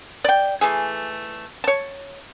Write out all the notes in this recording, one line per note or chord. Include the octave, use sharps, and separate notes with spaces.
D5 G5
E3 A3 G#4
C#5 A5